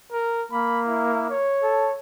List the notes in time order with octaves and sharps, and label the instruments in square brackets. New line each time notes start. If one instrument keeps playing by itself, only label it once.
[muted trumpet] A#4
[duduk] A#3 [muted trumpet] B5
[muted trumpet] E4
C#5
[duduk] A4